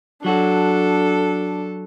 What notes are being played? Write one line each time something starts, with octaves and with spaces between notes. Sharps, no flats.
F#3 D4 F#4 A4